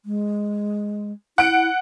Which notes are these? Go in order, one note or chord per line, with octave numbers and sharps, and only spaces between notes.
G#3
E4 F#5 D7